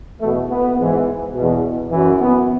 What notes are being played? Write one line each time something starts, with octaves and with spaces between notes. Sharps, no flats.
E2 B2 A3
B3
G#2 E3
B2
E2
F#2 E3
B3